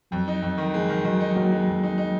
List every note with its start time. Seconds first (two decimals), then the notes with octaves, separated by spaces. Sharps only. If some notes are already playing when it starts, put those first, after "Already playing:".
0.11 F2 F#3
0.28 D#4
0.42 F2
0.58 D#3
0.74 F3 G#3
0.89 D#3
1.05 D#3 F#3
1.20 D#4
1.36 D#3 F#3 A#3
1.52 G#3
1.67 F2
1.83 D#4
1.98 D#4